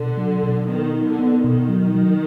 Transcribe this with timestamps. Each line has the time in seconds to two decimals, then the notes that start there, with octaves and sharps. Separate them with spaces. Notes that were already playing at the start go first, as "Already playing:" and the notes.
Already playing: B2 D3
0.18 F#3
0.43 B2
0.68 D#3 B3
0.94 D#4
1.07 D3
1.19 B3
1.44 B2 D#3
1.69 F#3
1.95 F#3